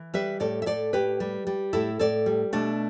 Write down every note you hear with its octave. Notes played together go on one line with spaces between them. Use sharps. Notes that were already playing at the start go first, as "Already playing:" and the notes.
Already playing: E3
G3 B4 E5
A2 A4 D5
E5
A2 A4 D5
A2 G4 B4
G3
G3
A2 E4 A4
A2 A4 D5
G3
B2 A3 D4